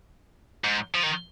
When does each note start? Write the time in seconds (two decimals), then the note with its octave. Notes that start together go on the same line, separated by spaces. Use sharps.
0.64 G#2
0.95 F3
1.03 D#3